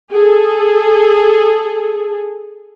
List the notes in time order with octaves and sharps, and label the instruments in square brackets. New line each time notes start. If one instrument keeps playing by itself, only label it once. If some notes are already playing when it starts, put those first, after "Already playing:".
[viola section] G#4 A4